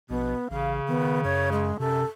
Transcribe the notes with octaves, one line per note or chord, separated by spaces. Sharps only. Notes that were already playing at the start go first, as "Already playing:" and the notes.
A#1 B2 B3
A1 C#3 F5
D#3 B3
F#2 C#5
G#3
F#2 C3 A4